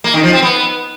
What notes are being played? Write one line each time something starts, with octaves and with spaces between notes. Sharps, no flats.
A#3
D#3
F3
C4
B3